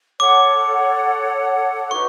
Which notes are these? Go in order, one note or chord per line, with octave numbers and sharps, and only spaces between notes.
A4 C#5 F#5 D6
D#4 F#4 B4 C#6